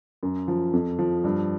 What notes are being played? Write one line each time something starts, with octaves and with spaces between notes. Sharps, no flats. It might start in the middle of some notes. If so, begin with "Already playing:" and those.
F#2
F3
F2
F3
G2